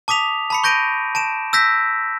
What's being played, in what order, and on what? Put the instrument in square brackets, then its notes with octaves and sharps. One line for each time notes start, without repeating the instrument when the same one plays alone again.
[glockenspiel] A5 D6 D#6 B6 F7
A5 B5 C#7
C#6 G6 A#6 D7 D#7
A5 D7 E7
E6 G6 A#6 B6